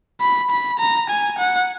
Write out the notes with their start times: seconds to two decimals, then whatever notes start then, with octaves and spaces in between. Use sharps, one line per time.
0.21 B5
0.51 B5
0.79 A#5
1.09 G#5
1.38 F#5